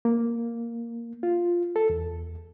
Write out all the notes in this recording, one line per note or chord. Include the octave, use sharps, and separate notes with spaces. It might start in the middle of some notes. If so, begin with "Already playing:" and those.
A#3
F4
A4
E2